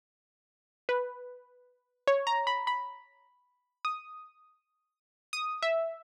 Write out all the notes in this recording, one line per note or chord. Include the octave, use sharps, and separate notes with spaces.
B4
C#5
A#5
B5
B5
D#6
D#6
E5